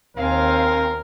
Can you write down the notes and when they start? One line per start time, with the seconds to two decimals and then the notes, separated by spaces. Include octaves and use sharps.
0.17 D#2 C4 A#4 F5 G#5